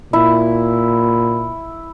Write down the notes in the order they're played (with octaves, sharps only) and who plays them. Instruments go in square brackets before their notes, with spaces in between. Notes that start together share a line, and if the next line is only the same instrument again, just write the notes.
[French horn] A#2 [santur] E4